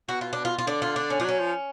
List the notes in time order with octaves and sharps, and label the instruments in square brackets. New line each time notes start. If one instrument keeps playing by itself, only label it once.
[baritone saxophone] B2 [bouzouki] F#4
[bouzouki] F4
D4
F4
F4
[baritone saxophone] D3 [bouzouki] D4
[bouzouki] F4
D4
C#4
[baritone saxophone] F3 [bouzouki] D4
[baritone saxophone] F#3 [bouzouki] C#4
[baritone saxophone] F3